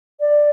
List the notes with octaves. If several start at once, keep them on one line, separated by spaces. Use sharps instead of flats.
D5